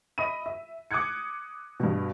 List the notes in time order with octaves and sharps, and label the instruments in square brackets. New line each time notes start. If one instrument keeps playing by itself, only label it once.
[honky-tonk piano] D#5 E5 B5 D#7
E5
D6 D#6 F#6 G#6 C#7
G2 B2